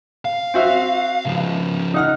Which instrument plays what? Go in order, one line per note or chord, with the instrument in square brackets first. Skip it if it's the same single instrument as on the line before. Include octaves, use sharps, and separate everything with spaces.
[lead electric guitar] F5
[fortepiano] C4 F#4 E5
[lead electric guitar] C#3 F3
[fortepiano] D#4 F#5 F6